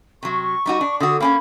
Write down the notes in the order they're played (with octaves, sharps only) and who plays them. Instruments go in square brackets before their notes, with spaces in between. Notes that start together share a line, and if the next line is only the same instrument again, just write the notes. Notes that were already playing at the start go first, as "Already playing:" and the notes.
[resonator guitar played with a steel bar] C3 F#3 [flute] C#6
[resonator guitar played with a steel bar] G3 D#4 F#4
D4
[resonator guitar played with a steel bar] D3 F#4 [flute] D#6
[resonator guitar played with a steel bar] A#3 C4 C#4 [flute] B5